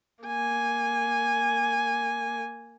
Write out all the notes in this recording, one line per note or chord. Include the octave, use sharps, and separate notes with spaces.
A#3 G#5